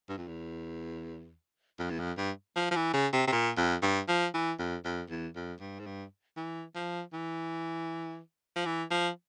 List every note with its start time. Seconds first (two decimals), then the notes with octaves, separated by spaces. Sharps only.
0.09 G2
0.18 F2
0.27 E2
1.79 F2
1.90 E2
1.99 F2
2.17 G2
2.56 F3
2.71 F3
2.75 E3
2.93 C#3
3.13 C3
3.27 C3
3.32 A#2
3.57 F2
3.82 G2
4.08 F3
4.34 E3
4.59 F2
4.85 F2
5.10 E2
5.36 F2
5.61 G2
5.80 G#2
5.86 G2
6.37 E3
6.75 F3
7.13 E3
8.56 F3
8.65 E3
8.91 F3